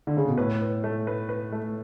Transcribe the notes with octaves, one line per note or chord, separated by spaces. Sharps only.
D3
C#3
B2
A2 B4
B4
A3
B4
B4
A3